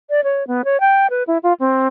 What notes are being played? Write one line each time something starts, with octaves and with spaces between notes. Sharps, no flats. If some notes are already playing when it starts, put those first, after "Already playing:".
D5
C#5
B3
C#5
G5
B4
E4
F4
C4